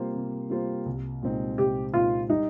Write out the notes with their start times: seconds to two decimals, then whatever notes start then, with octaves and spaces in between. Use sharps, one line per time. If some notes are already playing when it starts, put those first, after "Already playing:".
Already playing: C3 G3 A#3 F4 C5
0.15 C3
0.50 G3 A#3 F4 C5
0.86 C2
1.22 A#2 G#3 C4 D#4
1.58 C2 G4
1.94 A#2 G#3 C4 D#4 F4
2.29 G3 D#4